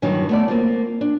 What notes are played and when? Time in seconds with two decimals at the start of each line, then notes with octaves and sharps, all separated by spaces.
0.02 G2 D#3 E3 F#3
0.29 A3 B3 D5
0.48 A#3 C4 F4
1.01 D4